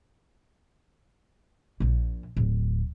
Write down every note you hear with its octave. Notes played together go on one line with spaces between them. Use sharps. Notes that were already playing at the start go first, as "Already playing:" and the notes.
A#1 A#2
D1